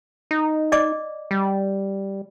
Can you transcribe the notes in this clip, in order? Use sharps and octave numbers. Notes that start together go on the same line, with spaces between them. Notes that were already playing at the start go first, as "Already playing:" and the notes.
D#4
D5 D#5 D6
G3